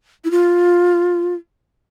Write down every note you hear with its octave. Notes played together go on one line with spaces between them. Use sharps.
E4
F4